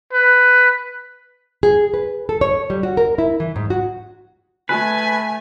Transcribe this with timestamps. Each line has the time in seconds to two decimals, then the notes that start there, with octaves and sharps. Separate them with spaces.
0.13 B4
1.63 G#4
1.94 B4
2.29 A4
2.41 C#5
2.70 G3
2.83 F#4
2.97 A#4
3.18 E4
3.40 E3
3.56 G#2
3.70 F#4
4.69 A3 B4 G#5